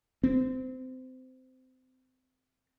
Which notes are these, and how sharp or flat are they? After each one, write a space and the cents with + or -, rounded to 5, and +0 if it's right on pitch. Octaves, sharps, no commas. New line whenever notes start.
C4 -25